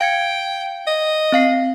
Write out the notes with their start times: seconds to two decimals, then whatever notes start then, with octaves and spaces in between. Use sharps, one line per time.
0.01 F5 G5 G#6 C#7
0.87 D#5
1.32 C4 F5 C7